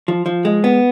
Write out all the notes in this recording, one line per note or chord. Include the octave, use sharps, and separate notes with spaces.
F3
F3
G#3
B3